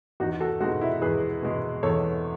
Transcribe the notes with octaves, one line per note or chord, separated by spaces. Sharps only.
E2 D#4 F#4
F#4 A4
B2 G#3 D#4 F#4
E4
E2 G#4 B4
B2 G#3
E2 A4 C#5